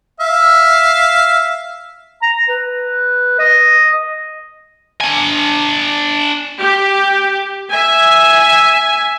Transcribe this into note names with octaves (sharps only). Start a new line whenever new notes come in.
E5 F5
A#5
B4
D#5
D4 G#5
G4
E5 G#5